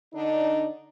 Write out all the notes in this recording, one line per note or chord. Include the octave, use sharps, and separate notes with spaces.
D3 D4 D#4